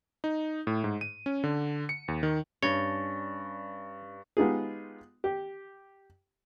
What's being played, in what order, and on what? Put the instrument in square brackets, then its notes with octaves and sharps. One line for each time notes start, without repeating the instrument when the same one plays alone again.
[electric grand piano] D#4
A2
G#2
D#7
C#4
D3
C#7
D#2
D#3
[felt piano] G2 [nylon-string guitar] C#4 D4 [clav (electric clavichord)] C#5 [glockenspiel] C#6 A6 A#6
[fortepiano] G#3 B3 D#4 F4 G4 G#4
G4